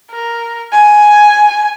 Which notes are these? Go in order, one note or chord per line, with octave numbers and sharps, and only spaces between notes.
A#4
G#5